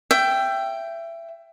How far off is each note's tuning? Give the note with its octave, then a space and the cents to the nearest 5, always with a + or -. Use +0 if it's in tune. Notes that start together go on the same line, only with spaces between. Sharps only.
E5 +25 G5 +0